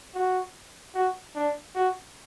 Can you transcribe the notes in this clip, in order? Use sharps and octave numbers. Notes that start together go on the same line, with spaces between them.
F#4
F#4
D4
F#4